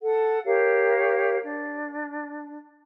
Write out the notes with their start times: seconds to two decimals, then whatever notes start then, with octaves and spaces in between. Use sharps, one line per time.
0.02 A4 F#5
0.45 G4 A#4 C#5 F5
1.45 D4